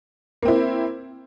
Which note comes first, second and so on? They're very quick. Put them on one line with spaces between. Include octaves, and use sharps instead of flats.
A#3 C4 E4